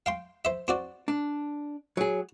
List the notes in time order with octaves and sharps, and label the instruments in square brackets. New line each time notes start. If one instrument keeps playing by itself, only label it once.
[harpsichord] F5 G5 C6
C5 E5
C4 F#4 D5
[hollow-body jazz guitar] D4
F#3 G#4